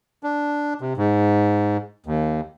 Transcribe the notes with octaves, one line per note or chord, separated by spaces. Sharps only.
D4
C3
G#2
D#2